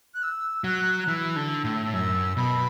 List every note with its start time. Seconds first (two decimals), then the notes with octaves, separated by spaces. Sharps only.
0.14 F#6
0.22 E6
0.64 F#3 F#6
1.00 F#6
1.08 E3 E6
1.36 D3
1.64 A2
1.93 F#2 E6
2.36 B2 B5